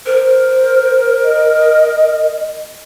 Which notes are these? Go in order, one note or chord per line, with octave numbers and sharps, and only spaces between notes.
A#4 C5
D#5